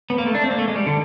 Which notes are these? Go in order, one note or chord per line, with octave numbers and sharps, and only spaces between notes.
B3
A#3
A3
D4
C4
A#3
A3
G#3
G3
D3